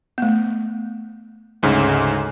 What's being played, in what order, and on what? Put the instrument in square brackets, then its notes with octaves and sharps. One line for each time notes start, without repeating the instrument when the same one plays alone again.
[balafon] A3 B3
[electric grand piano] D2 G#2 C#3